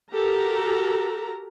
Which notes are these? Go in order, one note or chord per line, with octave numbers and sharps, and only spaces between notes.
F#4 G4 A4 A#4 A#5